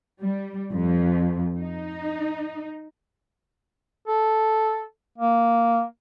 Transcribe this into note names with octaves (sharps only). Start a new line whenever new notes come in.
G3
F2
D#4
A4
A#3